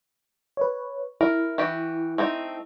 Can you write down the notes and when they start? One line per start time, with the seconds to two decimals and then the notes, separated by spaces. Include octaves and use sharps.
0.57 B4 C#5
1.21 E4 A#4
1.58 E3 F#4 G4
2.18 A3 C4 D#4